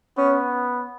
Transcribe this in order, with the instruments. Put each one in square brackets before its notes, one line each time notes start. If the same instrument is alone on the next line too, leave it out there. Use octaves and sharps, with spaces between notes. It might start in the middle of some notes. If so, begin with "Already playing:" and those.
[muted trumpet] B3 [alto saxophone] C#4